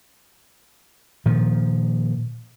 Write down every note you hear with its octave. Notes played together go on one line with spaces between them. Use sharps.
A#2 D#3 F3